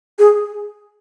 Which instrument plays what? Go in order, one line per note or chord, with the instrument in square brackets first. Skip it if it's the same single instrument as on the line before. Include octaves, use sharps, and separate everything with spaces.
[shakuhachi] G#4